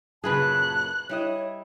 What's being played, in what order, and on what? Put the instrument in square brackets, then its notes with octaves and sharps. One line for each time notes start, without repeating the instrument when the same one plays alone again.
[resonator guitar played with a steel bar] F#2 A#2 C#3 [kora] G#4 B4 [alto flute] A5 [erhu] F#6
[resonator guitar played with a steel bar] G3 E4 D#5 [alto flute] C#5